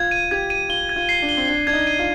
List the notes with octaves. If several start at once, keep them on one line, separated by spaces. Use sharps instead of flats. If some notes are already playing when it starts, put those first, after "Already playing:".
Already playing: F4 G#6
D#7
G4 G#6
D#7
F4 G7
G#6
F4
C7
D4
G7
C4
D4 G7
D4 G#6
D#4
D#7
F4